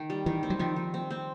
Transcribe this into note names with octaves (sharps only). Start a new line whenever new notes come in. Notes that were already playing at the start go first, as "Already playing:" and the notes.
Already playing: D#3
G3
D#3 E3
C4
F#3
D#3 F3
D#3
C4
C4